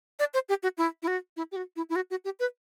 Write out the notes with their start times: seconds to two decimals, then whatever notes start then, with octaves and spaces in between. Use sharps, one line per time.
0.19 D5
0.34 C5
0.49 G4
0.63 F#4
0.78 E4
1.03 E4
1.07 F#4
1.37 E4
1.52 G4
1.56 F#4
1.76 E4
1.90 E4
1.96 F#4
2.10 F#4
2.25 G4
2.40 B4